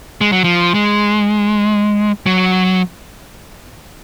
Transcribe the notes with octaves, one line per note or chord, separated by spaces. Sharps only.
G#3
F#3
F3
G#3
F#3